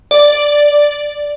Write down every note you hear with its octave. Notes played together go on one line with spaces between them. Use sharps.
D5